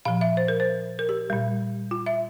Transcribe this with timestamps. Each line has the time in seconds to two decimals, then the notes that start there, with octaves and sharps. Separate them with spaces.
0.05 A#2 F3 F5
0.21 E5
0.37 C5
0.48 A#4
0.60 C5
0.99 A#4
1.09 G4
1.30 A#2 G3
1.91 F4
2.06 E5